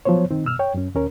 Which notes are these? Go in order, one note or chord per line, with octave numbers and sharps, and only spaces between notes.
F3 F#3 B3 C5 C#5
D#3 C4 D#4
B2 E6 F6
C#5 G5
F#2 C#4
D#2 C#4 A#4